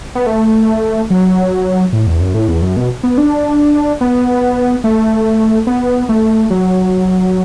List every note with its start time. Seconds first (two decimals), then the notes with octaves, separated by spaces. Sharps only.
0.15 B3
0.26 A3
1.10 F#3
1.93 A2
2.07 E2
2.21 F#2
2.34 A2
2.48 E2
2.62 F#2
2.77 B2
3.03 B3
3.18 D4
4.01 B3
4.84 A3
5.67 B3
6.09 A3
6.50 F#3